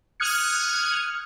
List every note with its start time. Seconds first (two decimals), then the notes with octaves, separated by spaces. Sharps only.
0.20 D#6 F6 F#6 G#6 C#7